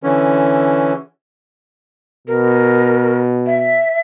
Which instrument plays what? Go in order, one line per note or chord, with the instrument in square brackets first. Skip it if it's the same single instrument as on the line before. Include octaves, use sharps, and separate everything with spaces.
[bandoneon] D3 E3 C#4
[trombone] B2 [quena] A#4
[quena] E5